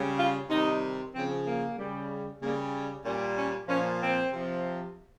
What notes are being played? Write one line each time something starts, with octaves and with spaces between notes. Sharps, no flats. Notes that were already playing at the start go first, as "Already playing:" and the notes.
Already playing: C#3 G3
F4
C3 D#3 G3 D#4
C#3 F3 C4
A#3
C#3 G3
C#3 G3 A#3
A#2 G3 C#4
C#4
A#2 F3 C#4
C4
C3 F3